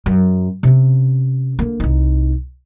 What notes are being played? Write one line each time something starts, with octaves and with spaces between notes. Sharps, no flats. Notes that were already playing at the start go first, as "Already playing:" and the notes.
F#2
C3 C#4
D3 A#3
C2 D#4